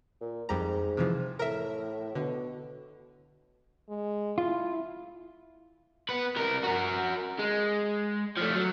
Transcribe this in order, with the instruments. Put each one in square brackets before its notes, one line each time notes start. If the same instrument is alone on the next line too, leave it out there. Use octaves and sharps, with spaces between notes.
[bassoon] A#2
[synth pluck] F2 G3 A#5 [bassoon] G#2
[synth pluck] C3 E3 F3
[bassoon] A2 [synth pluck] A#4 E5
[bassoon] B2 [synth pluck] D3
[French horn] G#3
[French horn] E4 [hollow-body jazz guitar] F4
[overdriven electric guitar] B3 B4
C2 A#4
F#4 A#4
G#3
F3 A3
F#3